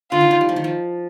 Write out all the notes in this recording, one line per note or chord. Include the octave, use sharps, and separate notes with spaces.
D3 F4
D#3
D#3
G3
F3
D#3
F3